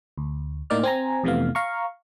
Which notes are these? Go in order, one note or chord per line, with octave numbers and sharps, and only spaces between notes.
D2
A2 A#3 D#4 D5 F6
C4 G#5 A#5
F2 C3 E3 A3 B3 F5
F5 A#5 C#6